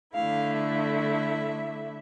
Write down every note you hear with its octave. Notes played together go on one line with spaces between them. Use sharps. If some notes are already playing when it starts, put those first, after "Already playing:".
D3 A3 E4 F5
E5